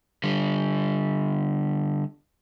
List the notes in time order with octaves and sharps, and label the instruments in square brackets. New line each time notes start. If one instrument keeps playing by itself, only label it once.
[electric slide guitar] D3 G3